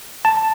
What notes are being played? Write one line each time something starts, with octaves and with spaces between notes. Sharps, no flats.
A5